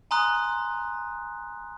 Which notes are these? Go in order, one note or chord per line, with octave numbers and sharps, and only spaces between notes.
G#5 A#5 C6 D#6 F#6